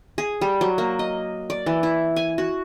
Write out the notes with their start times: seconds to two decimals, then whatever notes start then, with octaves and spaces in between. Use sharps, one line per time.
0.18 G#4
0.41 G3
0.61 F#3
0.78 A#3
0.99 D#5
1.50 D5
1.66 E3
1.83 E4
2.16 G#5
2.38 F#4